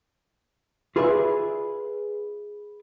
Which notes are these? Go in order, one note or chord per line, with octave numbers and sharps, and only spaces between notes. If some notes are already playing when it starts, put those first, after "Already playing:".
F4 G#4 B4 D5 E5